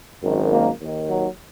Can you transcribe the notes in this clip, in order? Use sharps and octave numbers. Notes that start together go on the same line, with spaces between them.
G#1 F#2 D#3
A#3
D#2 D#3
F#3